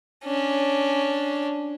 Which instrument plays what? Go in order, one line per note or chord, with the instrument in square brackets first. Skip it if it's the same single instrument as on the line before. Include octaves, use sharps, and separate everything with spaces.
[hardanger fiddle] C#4 D4